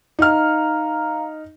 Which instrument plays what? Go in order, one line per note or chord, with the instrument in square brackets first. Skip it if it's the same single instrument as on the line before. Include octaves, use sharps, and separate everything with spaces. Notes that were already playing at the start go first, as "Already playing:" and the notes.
[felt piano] D#4 F6 [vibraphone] F5 A#5